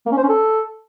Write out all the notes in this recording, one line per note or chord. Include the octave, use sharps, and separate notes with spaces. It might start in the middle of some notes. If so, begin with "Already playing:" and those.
A#3
C#4
C5
C#4
A4